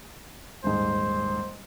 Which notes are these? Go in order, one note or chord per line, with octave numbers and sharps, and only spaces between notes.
D#1 G#2 C5